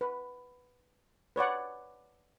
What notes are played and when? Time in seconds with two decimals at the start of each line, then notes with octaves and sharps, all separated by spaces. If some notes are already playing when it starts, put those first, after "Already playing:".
0.01 B4
1.36 B4 C#5 D5 F#5